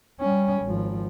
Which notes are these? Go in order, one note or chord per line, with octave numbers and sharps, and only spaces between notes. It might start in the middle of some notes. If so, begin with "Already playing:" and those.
G3 C#4
G#1 F3